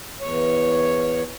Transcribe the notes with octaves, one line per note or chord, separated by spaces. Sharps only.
E2 C#5